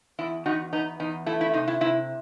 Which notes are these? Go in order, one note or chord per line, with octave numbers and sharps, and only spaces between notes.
E2 E4
E2 D#4 F#4
B3 D#4
E2 D#4
A3 E4
E4
C3 D#4
E4
C3 E4